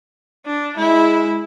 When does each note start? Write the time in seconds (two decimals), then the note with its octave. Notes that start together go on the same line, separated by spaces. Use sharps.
0.46 D4
0.77 G#3 E4